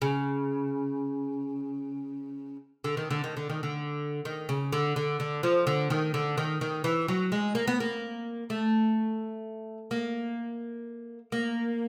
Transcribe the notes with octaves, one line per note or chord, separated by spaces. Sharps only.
C#3
D3
D#3
D3
D#3
D3
D#3
D3
D#3
C#3
D3
D3
D3
F3
D3
D#3
D3
D#3
D#3
E3
F#3
G#3
A#3
B3
A#3
A3
A#3
A#3